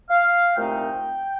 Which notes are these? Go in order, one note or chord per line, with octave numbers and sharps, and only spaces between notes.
F5
C2 A#2 A3 C4 D#4 G5